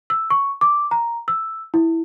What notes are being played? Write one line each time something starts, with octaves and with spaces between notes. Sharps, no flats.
E6
C#6
D6
A#5
E6
E4